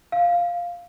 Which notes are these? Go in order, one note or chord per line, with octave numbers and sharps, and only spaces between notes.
F5